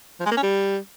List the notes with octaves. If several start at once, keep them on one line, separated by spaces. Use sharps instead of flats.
F3
G#3
A#3
C#4
G3